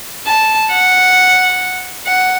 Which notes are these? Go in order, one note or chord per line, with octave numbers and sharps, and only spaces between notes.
A5
F#5
F#5